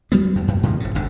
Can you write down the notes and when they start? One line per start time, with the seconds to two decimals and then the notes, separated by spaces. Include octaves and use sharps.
0.12 F#3 G3 B3
0.35 E2
0.48 F#2
0.63 G#2 D3 F3 G#3
0.80 F#1 C#3
0.95 D1 G1 F#2 D3